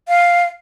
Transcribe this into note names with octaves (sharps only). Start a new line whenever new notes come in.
F5